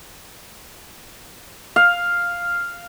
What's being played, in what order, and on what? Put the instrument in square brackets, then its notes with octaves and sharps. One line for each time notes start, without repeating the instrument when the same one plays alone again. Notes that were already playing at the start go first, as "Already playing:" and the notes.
[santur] F5